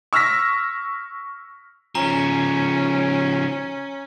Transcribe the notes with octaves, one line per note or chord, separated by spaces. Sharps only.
C#6 E6 F6 A#6 B6
C#3 F3 C#4 A#5